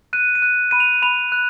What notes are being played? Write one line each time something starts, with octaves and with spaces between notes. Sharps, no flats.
F#6 D#7
D#7
F#6
B5 D#7
F7
B5 F7
F#6